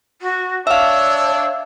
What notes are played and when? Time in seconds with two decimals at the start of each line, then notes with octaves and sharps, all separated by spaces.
0.21 F#4
0.67 D4 C#5 E5 F5 E6